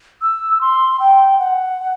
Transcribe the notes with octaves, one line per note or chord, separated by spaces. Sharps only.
E6
C6
G5
F#5